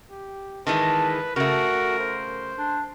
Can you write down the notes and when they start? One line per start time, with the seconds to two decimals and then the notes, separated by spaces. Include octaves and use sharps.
0.10 G4
0.67 D#3 E3 G#3 B4 A5
1.36 C#3 A3 F#4 A#4
1.99 C5
2.58 D4